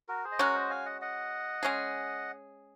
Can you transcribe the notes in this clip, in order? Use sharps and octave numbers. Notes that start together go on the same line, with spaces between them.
F#4 A#4
G#4 C5
D#5
G#3 C#4 F#4 A#4 C#5
C5 D#5
F5 G#5
D#5 F#5
D#5 F#5
G#3 C#4 G#4